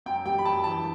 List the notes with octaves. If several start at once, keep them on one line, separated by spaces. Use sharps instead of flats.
F#2 G5
G3 G5
B5
F#2 A5
E3 A5